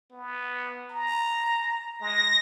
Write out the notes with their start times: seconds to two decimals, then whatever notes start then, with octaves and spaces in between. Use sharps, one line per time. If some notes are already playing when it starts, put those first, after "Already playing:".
0.12 B3
0.91 A#5
2.01 G#3 A#6